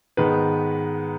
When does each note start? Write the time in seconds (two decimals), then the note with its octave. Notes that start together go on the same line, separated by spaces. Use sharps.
0.17 G#2 D#3 G#3 B3 B4